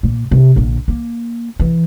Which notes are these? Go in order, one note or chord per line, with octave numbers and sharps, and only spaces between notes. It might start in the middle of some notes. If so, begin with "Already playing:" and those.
A#2
C3
A#1 D3
A#3
E3